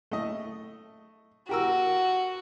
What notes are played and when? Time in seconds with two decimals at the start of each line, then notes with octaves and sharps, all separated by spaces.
0.11 A3 D#5
1.49 F#4 G4 A#4 E6